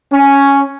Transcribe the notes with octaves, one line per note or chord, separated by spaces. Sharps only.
C#4